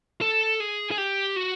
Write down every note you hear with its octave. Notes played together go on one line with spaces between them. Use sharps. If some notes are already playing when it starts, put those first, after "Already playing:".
A4
G#4
G#4
G4
F#4